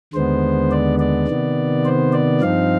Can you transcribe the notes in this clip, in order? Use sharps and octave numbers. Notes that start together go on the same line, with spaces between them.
D#2 D3 G#3 B3 C5
D5
D5
C3 D#3 B3
C5
D5
G2 F3 C4 D#4 F5